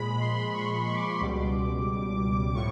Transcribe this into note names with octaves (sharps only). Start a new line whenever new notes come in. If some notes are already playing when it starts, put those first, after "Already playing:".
Already playing: A#2 F3 G#3 B5
C6
C#6
C#6
D6
C#6
C#2 B2 G3 D6
A2 F3 C#6